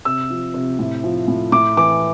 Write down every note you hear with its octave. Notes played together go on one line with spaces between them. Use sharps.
C3 E6
F3
C3
A2
F3
A2
A2 D6
E3 D6